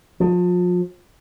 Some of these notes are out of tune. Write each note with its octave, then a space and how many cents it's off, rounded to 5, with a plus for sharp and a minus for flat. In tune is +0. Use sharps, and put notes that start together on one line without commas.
F3 +35